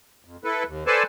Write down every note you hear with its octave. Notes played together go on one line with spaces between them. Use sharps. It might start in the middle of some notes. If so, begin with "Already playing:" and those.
F2
E4 A4 B4
D#2
A4 B4 C5 D5 G#5 A5